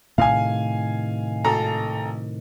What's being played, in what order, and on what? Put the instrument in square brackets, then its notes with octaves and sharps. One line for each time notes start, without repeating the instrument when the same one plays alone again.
[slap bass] A2 C3 D#3 [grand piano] F5 G#5
[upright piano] G#1 A4 A#5